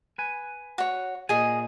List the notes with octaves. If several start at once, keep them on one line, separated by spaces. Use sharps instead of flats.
B4 G#5
F#4 C#5
A#2 G#4 D#5 G#5